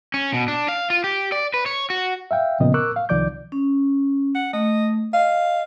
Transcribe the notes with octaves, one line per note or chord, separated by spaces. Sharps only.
C#4
B2
D4
F5
F4
G4
D5
B4
C#5
F#4
E5 F5 G5
A#2 C#3 F3 B3 D#5
A#4 C#6 D6 E6 F#6
F5
C2 D#3 F3 D5 D6 G6
C#4
F#5
A3 D#5
D#5 F5